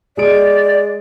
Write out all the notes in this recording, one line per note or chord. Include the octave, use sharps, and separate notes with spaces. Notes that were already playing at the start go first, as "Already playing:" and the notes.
G#3 G#4 D5 D7